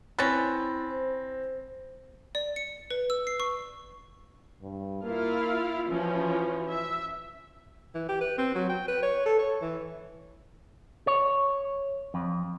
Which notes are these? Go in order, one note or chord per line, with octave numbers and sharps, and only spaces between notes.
C4 C#4 E4 B4 A6 A#6
C5
D5
C#7
B4
E6
C7
C#6
G2
A#3 E4 F4 F5
E3 F3 C#4 F#4
E5
E3
G4
B4
C4
F#3
G5
B4
C#5
A4
C#5
E3
C#5
F2